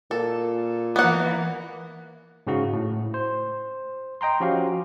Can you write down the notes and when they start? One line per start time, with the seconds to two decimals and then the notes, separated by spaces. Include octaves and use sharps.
0.11 A#2 A4
0.96 E3 A#3 B3 F#5
2.47 G#2 C#3 F#4
2.73 A2
3.14 C5
4.21 D#5 G5 A#5 C6
4.40 F3 C#4 F#4 G4 F5